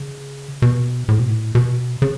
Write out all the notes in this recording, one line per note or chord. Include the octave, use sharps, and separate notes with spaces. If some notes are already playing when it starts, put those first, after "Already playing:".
Already playing: C#3
B2
A2
B2
A2
B2
C#3